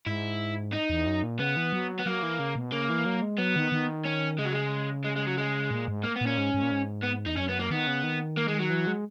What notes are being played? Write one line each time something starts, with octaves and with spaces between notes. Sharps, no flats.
G#2 E4
D#4
E2
F#2
A#2
C#3 B3
E3
F#3
B3
F#3 A#3
E3
C#3
B2
C#3 A#3
E3
F#3
G#3
F#3 B3
D#3
D#3
C#4
C#3 G#3
F#3
G#3
G#3
G#3
F#3
G#3
A#2
G#2
A#3
B3
A#2
C#4
G#2
G#2
A#2
G#2
B3
E2 D#4
F#2 C#4
B3
A#3
D#3 B3
C#3
D#3
A#3
G#3
F#3
E3
G#3